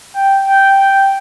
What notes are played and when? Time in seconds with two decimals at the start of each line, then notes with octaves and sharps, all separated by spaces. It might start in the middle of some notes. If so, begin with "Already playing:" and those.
0.15 G5
0.47 G5
0.79 G5